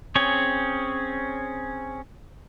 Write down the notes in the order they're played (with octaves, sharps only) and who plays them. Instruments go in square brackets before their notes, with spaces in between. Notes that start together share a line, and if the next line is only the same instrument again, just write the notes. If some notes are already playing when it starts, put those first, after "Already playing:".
[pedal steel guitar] C4 C#4 G#4 C#5